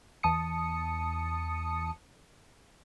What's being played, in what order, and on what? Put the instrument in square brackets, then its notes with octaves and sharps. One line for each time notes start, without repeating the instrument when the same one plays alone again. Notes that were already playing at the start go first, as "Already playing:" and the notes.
[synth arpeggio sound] E2 A5 D#6 C#7